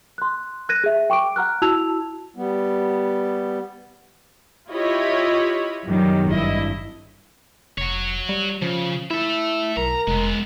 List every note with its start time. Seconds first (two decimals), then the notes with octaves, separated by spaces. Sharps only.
0.18 C6 F#6
0.69 F#6 G#6 A#6 D#7
0.84 G#4 E5
1.10 G5 C#6 D6 D7
1.36 F#5 A#5 F6 F#6
1.62 E4 F#4 A5 E6 G#6 F7
2.36 G3 B3
4.69 E4 F4 G4 C#5 D#5 B5
5.84 F#2 B2 D#3 F#3 G3
6.28 G#1 G2 E4 D#5
7.78 F1 F#4 C#5
8.29 G3
8.62 C#3 F3
9.10 E4 A4 E5
9.77 B1 A#4 A#5
10.08 F1 G#3 B3